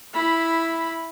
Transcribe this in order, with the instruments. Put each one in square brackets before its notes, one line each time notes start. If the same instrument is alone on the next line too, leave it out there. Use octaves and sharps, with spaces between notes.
[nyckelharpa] E4 B5